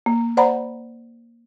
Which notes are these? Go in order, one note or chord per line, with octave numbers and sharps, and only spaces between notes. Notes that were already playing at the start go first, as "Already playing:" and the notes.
A#3
C5 D5 F#5 A#5 B5